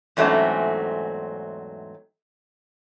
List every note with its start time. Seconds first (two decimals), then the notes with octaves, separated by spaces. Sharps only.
0.17 E2 G#2 F#3 A3 C4 C#4